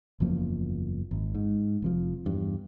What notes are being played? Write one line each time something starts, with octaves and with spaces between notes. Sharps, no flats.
F#1 E2 F3 A#3
G#1
G#2
F1 F2 F3
E2 G2